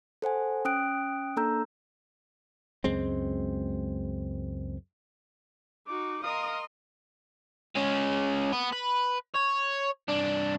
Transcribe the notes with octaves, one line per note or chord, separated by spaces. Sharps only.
A4 C5 F#5 G#5
C#4 G5 D#6 F#6 D7
A#3 D4 A4 A#5 E6 G6
C#2 F#2 G#3 C4
D#4 F#4 D6
A#4 D#5 F5 C6 D#6
G#3 C#4
B3
B4
C#5
C2 D4